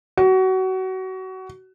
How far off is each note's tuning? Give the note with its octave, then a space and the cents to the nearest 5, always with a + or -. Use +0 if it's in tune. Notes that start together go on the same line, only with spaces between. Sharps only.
F#4 +25